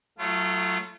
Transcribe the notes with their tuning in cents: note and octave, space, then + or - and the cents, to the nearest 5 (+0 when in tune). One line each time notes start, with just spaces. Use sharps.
F#3 +0 A3 +0 F4 -35